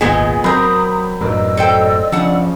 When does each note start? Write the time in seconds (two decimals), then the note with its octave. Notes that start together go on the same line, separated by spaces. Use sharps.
0.01 D#1 G#1 A#2 G#3 B3 G#4
0.44 F#3 C4 A#4 A#5 B5 D#6 G6
1.21 F#2 A2 F#3 A#4 B4 D5 D#5 E6
1.57 A4 C5 G5
2.12 C#3 F3 D4 F#5